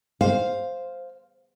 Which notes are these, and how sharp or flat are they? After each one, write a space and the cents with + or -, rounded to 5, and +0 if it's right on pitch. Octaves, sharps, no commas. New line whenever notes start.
C5 +0 F5 +0